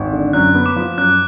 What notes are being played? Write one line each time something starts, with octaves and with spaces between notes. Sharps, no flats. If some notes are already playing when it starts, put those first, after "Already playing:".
Already playing: G#1
D3
F#2 F#6
B3
D6
F3
F#2 F#6